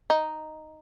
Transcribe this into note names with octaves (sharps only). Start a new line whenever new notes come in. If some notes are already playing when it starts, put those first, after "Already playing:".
D#4